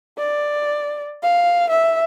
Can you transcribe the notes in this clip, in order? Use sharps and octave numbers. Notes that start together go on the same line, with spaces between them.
D5
F5
E5